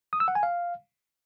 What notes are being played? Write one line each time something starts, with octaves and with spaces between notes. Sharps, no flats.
D#6
E6
F#5
G#5
F5